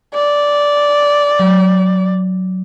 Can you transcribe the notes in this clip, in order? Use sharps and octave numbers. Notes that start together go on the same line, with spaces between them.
D5
F#3